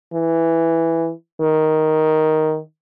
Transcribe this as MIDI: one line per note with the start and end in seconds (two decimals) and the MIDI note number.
0.13 1.11 52
1.41 2.59 51